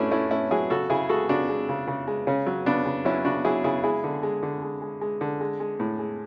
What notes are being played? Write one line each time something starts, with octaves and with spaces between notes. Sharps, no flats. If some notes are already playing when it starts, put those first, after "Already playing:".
Already playing: A2 A3 C#4 D4 E4 F#4
A3 C#4 E4
A2 C#4 E4
F#3 E4 G#4
C#3 F#4 A4
C#3 E4 G#4
G#3 F#4 A4
C#3 D4 F#4
G#3
C#3
C#3
G#3
C#3 C#4
F#3
C#3 B3 D4
C#3
F#3 C#4 E4
C#3 D4 F#4
F#3 E4 G#4
C#3 E4 G#4
G#3 E4 G#4
D3
G#3
D3
G#3
G#3
G#3
D3
G#3
G#3
A2
G#3